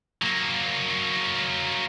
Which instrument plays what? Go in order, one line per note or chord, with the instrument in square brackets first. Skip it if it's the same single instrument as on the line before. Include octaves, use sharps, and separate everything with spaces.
[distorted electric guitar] F#3 A#3